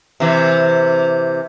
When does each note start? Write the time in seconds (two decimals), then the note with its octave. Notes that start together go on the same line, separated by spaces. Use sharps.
0.20 C3 E3